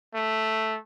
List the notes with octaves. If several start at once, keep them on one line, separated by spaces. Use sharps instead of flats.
A3